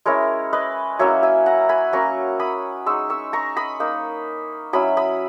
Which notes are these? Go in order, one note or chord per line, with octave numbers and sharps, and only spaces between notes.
G#3 C#4 E4 A#4 C#5
B4 D#5
F#3 A#3 C#4 E4 C#5 E5
E5 G#5
F#5 A#5
G#5 B5
F#3 A#3 C#4 A#5 C#6
B5 D#6
G#3 D#4 C#6 E6
C#6 E6
A#5 C#6
B5 D#6
A#3 D#4
F#3 C#4 E4 B5 D#6
B5 D#6